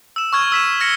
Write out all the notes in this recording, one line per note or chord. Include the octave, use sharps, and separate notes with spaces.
E6 E7
C#6 F6 G#6
E6 B6 E7
F6 A#6 C#7